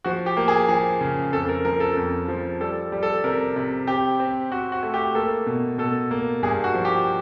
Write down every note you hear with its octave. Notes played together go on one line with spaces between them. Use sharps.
F3 F#4
G4
A#3
G#4
F3 G#4
C#3
F2 A4
A#4
F3 A#4
A4
F2
F3
G3 A4
G3
A4
C3 A#4
C3
C4 G4
C4
C4 F#4
F#4
A3
G4
A#3 A4
B2
B2 A4
A#3
G2 G#4
F#4
F3
G4